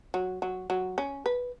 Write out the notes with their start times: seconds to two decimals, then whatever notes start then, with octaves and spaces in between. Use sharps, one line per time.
0.14 F#3
0.42 F#3
0.70 F#3
0.98 C#4
1.26 B4